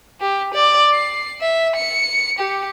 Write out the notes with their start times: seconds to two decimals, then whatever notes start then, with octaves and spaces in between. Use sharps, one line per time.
0.21 G4
0.54 D5
0.94 C7
1.41 E5
1.76 C#7
2.39 G4